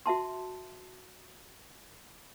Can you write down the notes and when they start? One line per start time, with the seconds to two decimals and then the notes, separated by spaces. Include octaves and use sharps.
0.06 F#4 E5 A5 C6